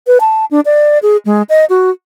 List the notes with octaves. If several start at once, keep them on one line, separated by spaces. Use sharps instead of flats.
B4
A5
D4
D5
G#4
G#3
D#5
F#4